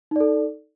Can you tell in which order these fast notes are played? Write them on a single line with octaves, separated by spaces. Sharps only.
D#4 D5 A4